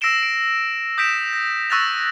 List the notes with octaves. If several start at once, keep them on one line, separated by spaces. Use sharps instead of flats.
E6 A#6 C7 D7 E7 G7
D7
D#6 G6 A#6 B6 D7 E7
A#6
C#6 E6 F#6 A6 A#6 F7